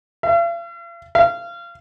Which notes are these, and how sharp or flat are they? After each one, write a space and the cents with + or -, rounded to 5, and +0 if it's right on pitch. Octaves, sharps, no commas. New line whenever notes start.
F5 -45
F5 -25